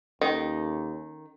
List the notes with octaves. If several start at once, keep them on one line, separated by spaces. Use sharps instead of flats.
D#2 D#3 C#4 A4